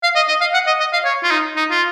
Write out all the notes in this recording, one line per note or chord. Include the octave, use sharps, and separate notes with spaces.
F5
D#5
D#5
F5
F#5
D#5
D#5
F5
C#5
F4
D#4
D#4
F4